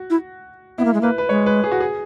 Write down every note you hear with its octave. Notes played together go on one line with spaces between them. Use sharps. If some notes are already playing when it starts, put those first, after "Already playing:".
Already playing: F#4
E4
B3 E4
A#3
G#3
A#3 B4
B4
G#3 C#5
B4
G#4
F#4
G#4